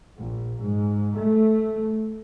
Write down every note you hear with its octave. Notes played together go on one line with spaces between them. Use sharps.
A#1
G#2
A3